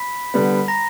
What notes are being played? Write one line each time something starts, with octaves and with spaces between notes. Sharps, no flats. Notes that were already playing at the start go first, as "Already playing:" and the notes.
Already playing: B5 B6
D3 G3 B3
A#5 A#6